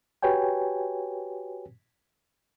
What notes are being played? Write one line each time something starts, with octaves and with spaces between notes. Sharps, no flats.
F#4 G4 B4 C#5 G5 G#5